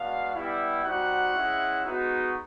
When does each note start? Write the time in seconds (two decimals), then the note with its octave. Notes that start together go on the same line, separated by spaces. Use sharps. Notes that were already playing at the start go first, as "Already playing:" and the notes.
Already playing: G#3 B3 D4 F#4 F5
0.33 G3 B3 E4 G4
0.83 G3 C4 D#4 F#4 F#5
1.34 G#3 C#4 E4
1.85 G#3 B3 D#4 F#4